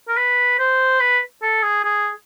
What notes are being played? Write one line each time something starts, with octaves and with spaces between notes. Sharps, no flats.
A#4
B4
C5
B4
A4
G#4
G#4